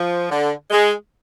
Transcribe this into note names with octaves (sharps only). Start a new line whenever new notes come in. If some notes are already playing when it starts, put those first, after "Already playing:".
Already playing: F3
D3
G#3